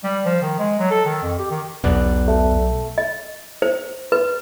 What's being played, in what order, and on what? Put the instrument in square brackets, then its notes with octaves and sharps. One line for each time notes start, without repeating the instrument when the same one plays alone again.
[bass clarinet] G3
F3
D#3
G#3
F#3
A4
D#3
F2
G4
D#3
[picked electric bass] B1 [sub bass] E2 [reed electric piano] B3 D5 F#6
[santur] A3
[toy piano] D#5
C5
B4